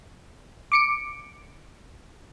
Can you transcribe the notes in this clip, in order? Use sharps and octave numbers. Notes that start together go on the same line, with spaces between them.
D6 C#7 D7